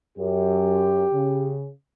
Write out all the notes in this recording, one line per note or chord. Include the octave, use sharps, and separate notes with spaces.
F#2 G4
C#3